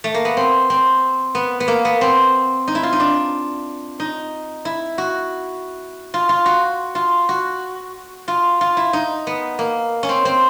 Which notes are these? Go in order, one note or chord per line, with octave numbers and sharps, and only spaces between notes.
A3
A#3
B3
C4
C4
B3
B3
A#3
B3
C4
D#4
E4
F4
D#4
D4
D#4
E4
F#4
F4
F4
F#4
F4
F#4
F4
F4
E4
D#4
B3
A#3
C#4
C4
C4